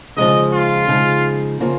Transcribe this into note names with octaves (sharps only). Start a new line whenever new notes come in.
C#3 F3 G#3 D#4 D#5
F4
C#3 F3 G#3 D#4
C#3 F3 A#3 F4